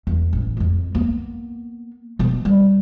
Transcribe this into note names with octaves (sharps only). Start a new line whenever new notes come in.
E2
A1
F2 G#3
A#3 B3
B2 B3
G3